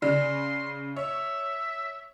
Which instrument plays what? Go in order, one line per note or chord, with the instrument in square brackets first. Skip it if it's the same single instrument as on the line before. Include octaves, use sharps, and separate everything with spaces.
[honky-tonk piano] C#3 [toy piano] D5 [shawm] C6
[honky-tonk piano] C#5 [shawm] E5